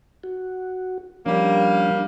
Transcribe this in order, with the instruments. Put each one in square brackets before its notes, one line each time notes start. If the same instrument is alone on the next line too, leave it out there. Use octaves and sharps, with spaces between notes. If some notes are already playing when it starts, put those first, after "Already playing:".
[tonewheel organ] F#4
[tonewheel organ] F3 C#4 D4 [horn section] G3 A#3